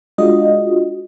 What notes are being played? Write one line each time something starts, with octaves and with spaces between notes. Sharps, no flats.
G#3 D4 F4 F#4 D#5